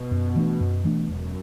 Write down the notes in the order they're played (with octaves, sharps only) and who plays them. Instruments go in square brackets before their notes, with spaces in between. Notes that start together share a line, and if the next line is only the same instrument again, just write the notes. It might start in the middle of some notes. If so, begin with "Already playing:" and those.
Already playing: [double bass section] B2
[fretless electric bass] F#2
E3 A3 D4
F#2
E3 A3 D4
[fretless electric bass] E1 [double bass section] F#2